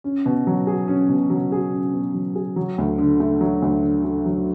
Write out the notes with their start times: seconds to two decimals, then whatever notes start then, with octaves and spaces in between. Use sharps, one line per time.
0.04 C#4
0.26 B2
0.47 F#3
0.67 G#4
0.88 C#4
1.09 B2
1.30 F#3
1.52 G#4
1.73 C#4
1.93 B2
2.14 F#3
2.35 G#4
2.56 F#3
2.78 D2
2.98 D3
3.20 A3
3.41 F#3
3.62 D2
3.83 D3
4.04 A3
4.26 F#3